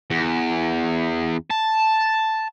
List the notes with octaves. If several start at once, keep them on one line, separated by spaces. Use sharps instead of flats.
E2
A5